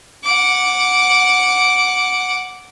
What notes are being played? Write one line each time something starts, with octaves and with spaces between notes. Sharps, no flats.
F#5 D6